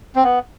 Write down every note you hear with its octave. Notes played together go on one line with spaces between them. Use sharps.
C4
B3